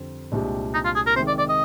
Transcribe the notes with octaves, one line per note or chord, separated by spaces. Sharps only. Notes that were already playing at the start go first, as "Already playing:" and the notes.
Already playing: F2 D3 G3 C4
C2 A#2 G#3 D4 G4
D#4
F4
G#4
A#4
C3 D#3 G#3 C5
D5
D5
D#5